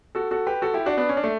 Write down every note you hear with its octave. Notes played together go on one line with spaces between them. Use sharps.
F#4 A4
F#4 A4
G4 B4
F#4 A4
E4 G4
D4 F#4
B3 D4
C#4
D4
A3